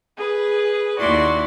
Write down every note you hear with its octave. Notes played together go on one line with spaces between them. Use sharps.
G#4 B4
D#2 E4 F#4 D5 C6